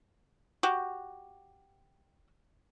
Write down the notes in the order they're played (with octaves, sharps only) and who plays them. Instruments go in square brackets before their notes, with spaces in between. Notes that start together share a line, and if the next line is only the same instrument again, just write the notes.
[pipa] F#4 G4